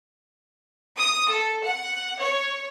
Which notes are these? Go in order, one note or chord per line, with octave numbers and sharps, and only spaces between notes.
D#6
A4
F#5
C#5